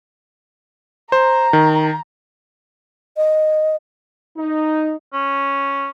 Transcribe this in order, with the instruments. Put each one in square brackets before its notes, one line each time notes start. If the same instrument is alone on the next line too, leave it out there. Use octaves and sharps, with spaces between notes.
[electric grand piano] C5 [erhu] A#5
[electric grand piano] D#3
[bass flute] D#5
[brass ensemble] D#4
[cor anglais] C#4